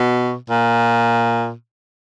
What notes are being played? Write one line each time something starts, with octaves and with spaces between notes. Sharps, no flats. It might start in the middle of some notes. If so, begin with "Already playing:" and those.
Already playing: B2
A#2